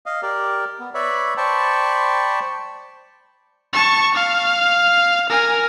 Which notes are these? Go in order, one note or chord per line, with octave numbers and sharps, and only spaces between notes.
D#5 F5
G4 A#4 D5
B3
B4 C#5 D5 E5 B5
C5 D5 G5 A5 B5 C#6
A5 C#6
F5
A#4 G#5